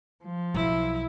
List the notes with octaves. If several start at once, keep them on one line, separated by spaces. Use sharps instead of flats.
F3
B1 F#3 E4